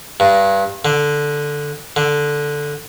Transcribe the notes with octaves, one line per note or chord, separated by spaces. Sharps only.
G2
D3
D3